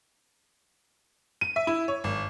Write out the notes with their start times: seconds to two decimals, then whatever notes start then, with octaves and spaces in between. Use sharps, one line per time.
1.41 D#7
1.56 E5
1.67 E4
1.88 C#5
2.04 G#1